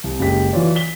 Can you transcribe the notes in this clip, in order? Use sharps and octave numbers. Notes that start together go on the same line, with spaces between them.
C2
F#1 C#3 G#3 G4 B6
E3 F#3 F4 C#5 D5
B6 G7